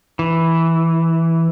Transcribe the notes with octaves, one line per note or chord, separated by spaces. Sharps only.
E3